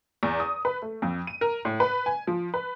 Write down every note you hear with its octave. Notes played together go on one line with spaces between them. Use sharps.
E2
D#6
B4
A3
F2
D#7
A#4
A2
B4
G#5
F3
B4